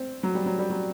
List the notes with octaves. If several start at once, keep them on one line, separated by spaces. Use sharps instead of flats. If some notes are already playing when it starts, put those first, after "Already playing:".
Already playing: C4
F#3
G3
F#3
G3
F#3